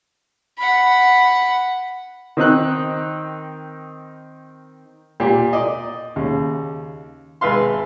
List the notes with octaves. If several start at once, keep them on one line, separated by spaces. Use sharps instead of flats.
F#5 B5
D#3 C4 D#4 F#6
A#2 G4
D5 D#5
D#2 C#3
G#1 B4 E5 F5 C6